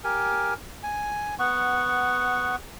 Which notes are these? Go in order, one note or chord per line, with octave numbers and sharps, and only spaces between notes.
G4 A#4 G#5
G#5
B3 F#5 C#6